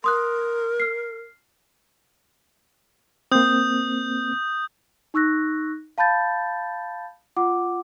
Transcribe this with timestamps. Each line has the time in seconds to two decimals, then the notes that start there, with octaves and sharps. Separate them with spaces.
0.04 A#4 C6 D#6 F#6
0.80 F6 C7
3.32 A#3 C4 D#6 G6
5.14 D#4 C#6 E6 F#6 A#6
5.98 F5 A5 B5 G6 A6
7.37 F4 F#5 D6